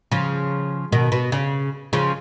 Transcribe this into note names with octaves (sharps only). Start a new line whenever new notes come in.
C#3 F3
B2 D#3
B2
C#3
C#3 F3